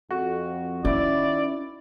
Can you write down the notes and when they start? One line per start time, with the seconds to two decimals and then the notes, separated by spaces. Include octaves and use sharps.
0.11 F2 F#4
0.85 D#3 C#4 E4 D5